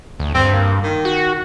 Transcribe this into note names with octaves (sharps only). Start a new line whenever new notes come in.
D2
G2 C4
A#3
D#3
F#4